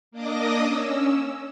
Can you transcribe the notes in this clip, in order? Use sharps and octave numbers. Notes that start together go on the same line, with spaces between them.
A#3 D4 D#5 D6 D#6 A#6
C#4 E6